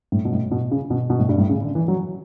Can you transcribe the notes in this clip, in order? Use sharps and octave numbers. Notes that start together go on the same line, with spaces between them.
A2
B2
A2
B2
C#3
B2
B2
A2
G2
A2
C#3
D3
E3
F#3